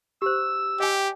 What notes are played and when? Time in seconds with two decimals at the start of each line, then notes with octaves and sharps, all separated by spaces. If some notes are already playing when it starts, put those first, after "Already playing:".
0.22 G4 C5 E6
0.80 G4 D#5 G5 G#5